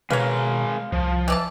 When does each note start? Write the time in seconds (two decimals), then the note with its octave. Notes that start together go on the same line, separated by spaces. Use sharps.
0.10 B2 G#3 A#4 B4 C#5 F5
0.92 C2 F3
1.28 E3 D5 A5